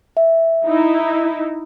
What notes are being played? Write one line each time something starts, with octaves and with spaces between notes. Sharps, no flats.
E5
D#4 E4